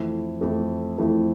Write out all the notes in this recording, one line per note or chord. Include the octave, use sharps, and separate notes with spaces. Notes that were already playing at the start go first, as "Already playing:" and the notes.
Already playing: F2 E3 A3 E4
F2 E3 A3 E4
F2 E3 A3 E4